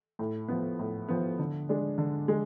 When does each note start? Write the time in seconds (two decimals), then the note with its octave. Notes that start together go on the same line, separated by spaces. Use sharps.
0.19 A2
0.48 F3 B3
0.79 A2
1.08 F3 B3
1.39 D3
1.69 G#3 D4
1.98 D3
2.28 G#3